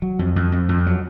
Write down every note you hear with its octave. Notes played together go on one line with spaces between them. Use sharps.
F#3
F2
F2
F2
F2
F#3